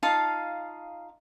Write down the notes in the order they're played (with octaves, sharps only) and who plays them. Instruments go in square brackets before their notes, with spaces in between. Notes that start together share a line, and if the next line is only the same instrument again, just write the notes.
[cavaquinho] D#4 F4 F5 A5